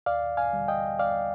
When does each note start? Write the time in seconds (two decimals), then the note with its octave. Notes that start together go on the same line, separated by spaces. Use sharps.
0.06 D#2 D5 F5
0.37 F5 G#5
0.53 D3 G3
0.68 D#5 G5
0.99 D#2 D5 F5